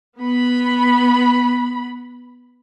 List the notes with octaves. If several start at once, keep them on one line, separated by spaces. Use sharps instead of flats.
B3 B5